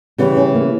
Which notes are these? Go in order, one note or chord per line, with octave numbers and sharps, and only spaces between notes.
C#3 E3 G3 B3
C#4
A#3